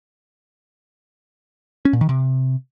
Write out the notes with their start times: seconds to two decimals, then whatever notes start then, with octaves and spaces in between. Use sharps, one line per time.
1.85 C#4
1.93 A#2
2.01 D#3
2.09 C3